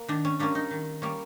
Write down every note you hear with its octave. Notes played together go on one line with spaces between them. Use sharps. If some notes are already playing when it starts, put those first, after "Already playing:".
Already playing: A#3
D#3 D4
C#4
G3 A#3 C#4 D4
D#4
D#3
G3 A#3 C#4